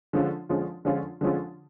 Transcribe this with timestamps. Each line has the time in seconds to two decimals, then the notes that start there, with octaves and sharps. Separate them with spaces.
0.13 D3 F3 G#3 C#4 F4
0.49 D3 F3 G#3 C#4 F4
0.85 D3 F3 G#3 C#4 F4
1.21 D3 F3 G#3 C#4 F4